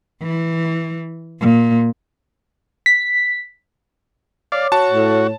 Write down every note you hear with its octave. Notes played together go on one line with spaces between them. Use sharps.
E3
A#2
B6
C#5 D5 F5 D6
F#4 C#5 A5
A2